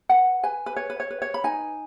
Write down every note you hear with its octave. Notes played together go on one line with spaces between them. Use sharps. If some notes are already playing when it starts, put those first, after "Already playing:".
B4 F#5
B4 G#5
B4
B4 C#5
B4
C#5
B4
C#5
B5
D#4 G#5